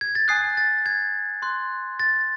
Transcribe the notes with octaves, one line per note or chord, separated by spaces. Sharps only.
G#6
A6
G#5 D#6 F#6 C7
A6
G#6
C6 F#6
A6